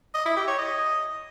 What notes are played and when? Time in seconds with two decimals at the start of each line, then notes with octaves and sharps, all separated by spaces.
0.15 D#5
0.26 E4
0.37 G4
0.48 C#5
0.59 D#5